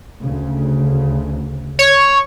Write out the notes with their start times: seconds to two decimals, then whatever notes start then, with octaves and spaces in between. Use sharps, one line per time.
0.22 D2 C#3
1.79 C#5